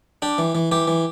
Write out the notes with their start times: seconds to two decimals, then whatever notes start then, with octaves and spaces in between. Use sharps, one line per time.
0.22 D4 G4
0.38 E3
0.55 E3
0.72 E3 G4
0.88 E3